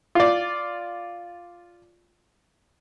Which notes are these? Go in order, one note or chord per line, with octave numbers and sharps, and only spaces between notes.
F4 D5